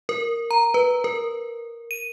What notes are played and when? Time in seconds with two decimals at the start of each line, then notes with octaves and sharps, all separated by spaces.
0.09 A#4
0.51 A#5
0.74 B4
1.04 A#4
1.91 D#7